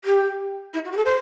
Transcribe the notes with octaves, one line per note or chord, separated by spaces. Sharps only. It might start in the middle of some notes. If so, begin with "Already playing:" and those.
G4
E4
F#4
G4
A4
C5